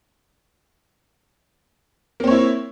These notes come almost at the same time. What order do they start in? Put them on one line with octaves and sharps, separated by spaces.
A#3 C4 C#5 E4